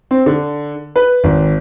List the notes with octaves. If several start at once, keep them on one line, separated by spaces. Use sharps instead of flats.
C4
D3
B4
G#1